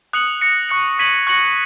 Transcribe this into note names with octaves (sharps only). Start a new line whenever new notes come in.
D#6 F#6 C#7 F#7
D#6 A#6 C#7
C#6 F#6 C#7
C#6 G#6 B6 D#7 F#7
C#6 F#6 A#6 C#7 F#7